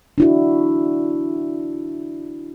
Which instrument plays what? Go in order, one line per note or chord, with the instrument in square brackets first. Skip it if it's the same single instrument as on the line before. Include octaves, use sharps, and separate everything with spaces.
[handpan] D4 E4 F#4